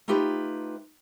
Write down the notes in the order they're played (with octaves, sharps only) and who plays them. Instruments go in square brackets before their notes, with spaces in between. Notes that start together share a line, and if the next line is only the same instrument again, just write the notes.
[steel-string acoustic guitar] A3 D#4 F4 G4 B4